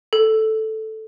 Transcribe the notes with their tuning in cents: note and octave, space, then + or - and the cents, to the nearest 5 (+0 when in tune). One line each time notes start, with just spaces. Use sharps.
A4 -5